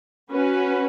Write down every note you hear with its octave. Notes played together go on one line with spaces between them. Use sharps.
C#4 F#4 B4